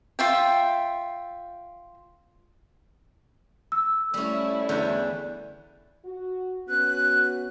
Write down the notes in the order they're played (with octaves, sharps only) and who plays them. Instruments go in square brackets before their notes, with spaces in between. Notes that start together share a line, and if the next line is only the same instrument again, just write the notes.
[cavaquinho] F4 E5 G5
[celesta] E6
[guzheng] G3 C#4 [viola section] A3 E4
[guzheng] E2 D3 G5
[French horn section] F#4
[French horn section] B3 C#4 F#4 [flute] F#6